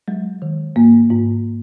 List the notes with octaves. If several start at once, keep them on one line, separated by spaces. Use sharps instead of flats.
F#3 G#3
D#3
G#2 A#3
G#2